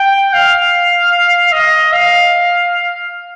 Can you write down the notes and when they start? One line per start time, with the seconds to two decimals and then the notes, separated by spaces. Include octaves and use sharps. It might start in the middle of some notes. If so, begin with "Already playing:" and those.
Already playing: G5
0.33 F5
1.52 D#5
1.93 F5